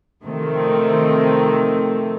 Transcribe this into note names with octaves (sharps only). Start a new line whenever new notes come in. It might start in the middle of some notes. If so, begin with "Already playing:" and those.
C3 D#3 F3 A3 C4